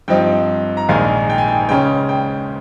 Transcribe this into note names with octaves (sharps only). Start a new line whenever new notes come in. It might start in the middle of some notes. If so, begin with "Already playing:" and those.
G2 F3 C4 D#4 G5
A#5
A#1 G#2 D#3 G#3 F5 G#5
G5
G#5
G5
C#2 C#3 G#3 C#4 G5
G5